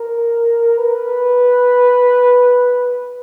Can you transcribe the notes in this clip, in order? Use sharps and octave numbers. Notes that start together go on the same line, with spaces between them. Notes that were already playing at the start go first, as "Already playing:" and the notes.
Already playing: A#4
B4